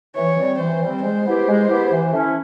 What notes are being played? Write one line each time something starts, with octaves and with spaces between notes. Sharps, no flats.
E3 C#5
G3 C4
E3 C5
G3 C4
G#3 C5
B3 E4 G4
G#3
B3 E4 G4
E3
A3 C#4 E4